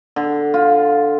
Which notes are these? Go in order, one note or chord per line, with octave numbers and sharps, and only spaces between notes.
D3
F4